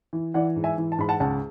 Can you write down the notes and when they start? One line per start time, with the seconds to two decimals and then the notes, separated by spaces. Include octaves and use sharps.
0.13 E3
0.34 E3 D5 F#5
0.56 G#2
0.64 E5 G#5
0.78 E3
0.92 A5
0.98 G#2 B5
1.09 F#5 A5
1.20 C#2 F#5 A5